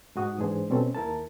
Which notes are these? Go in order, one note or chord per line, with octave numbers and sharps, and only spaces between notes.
G#2 D#4 F#4 D#6
G#2 E3 D4 G#4 C5
B2 G3 C4 C#4 A4
D#2 E4 A#4 A5